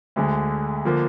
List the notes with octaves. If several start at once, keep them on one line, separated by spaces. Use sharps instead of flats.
D2 D3 G#3
D3 F3 A#3